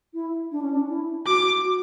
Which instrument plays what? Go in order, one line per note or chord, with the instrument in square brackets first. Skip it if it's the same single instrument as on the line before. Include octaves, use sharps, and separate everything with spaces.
[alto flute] E4
D4
C#4
D4
E4
[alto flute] F#4 [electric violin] D6
[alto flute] F#4